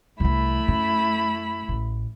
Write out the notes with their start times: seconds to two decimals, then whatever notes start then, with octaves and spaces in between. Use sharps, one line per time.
0.20 C2 E3 A3 E4 B5
0.68 F#2
1.69 A1